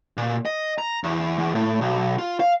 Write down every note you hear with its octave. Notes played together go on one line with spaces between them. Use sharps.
A#2
D#5
A#5
E2
E2
A2
B1
F4
F5